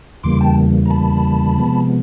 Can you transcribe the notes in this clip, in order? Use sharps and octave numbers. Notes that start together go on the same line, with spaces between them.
E2 C#3 E3 G3 A#3 C6 D6
G5 A5
A#5
A5 B5
C3 F3 G#3 B3